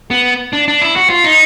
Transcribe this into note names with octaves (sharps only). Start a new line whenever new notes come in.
B3
D4
D4
E4
F#4
F4
D#4